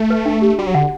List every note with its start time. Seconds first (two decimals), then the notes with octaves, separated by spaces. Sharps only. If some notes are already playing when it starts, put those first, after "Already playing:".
Already playing: A3
0.10 B4
0.26 D4
0.42 G4
0.59 G3 F#4
0.67 F#3
0.74 D3 F#5